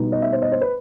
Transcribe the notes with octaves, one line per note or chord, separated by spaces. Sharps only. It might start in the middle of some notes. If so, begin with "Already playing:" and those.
Already playing: B2 G3 B3 D#4
D#5
E5
C5
D#5
C5
B4